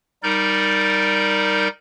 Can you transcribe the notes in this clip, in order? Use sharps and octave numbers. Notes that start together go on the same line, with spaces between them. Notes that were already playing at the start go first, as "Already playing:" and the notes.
G3 D#4 A#4 D5 G6